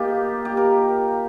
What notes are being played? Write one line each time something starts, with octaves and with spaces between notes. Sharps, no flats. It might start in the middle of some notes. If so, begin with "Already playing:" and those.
Already playing: A#3 D#4 F4 G4
G4
A#4